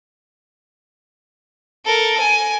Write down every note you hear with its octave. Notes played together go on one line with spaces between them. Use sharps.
A4 A#4
G#5